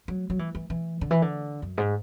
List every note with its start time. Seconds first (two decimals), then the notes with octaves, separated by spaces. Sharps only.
0.08 F#3
0.30 F#3
0.39 E3
0.55 E3
0.70 E3
1.01 D3
1.11 E3
1.22 D3
1.62 F#2
1.78 G#2